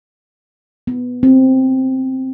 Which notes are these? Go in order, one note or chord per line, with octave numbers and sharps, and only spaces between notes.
B3
C4